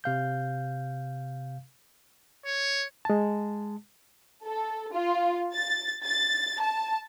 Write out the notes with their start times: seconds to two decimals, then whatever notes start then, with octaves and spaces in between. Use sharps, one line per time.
0.04 C3 F5 G6
2.45 C#5
3.05 G#3 A5
4.45 A4
4.93 F4
5.53 A6
6.05 A6
6.61 A5